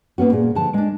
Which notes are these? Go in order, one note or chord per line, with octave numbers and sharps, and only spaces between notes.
A#3 B3 C#4 F#4
A#2 G#4
D3 F3 A5
G#3 D4